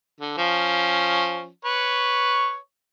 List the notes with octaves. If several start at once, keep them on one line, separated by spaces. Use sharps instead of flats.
D3
F3 C#4
B4 C#5 C#6